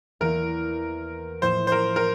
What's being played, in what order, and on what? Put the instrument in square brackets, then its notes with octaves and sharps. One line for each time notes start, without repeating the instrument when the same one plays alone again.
[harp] E2 E3 A#3 E4 [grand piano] A#4
[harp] A2 F3 A#3 E4 [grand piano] C5
[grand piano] C5
A#4
A#4